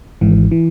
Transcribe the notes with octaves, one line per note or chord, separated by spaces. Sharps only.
G#1 G#2 E3
E3